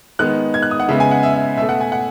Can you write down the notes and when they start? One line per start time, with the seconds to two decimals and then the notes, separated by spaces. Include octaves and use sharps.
0.19 D#3 G#3 B3 F#6
0.54 G#6
0.62 F#6
0.71 D#6
0.80 F#5
0.89 C#3 G#3 B3 E5
1.00 G#5
1.11 F#5
1.23 E5
1.34 E5
1.57 B2 A3 E5
1.69 F#5
1.81 G#5
1.92 F#5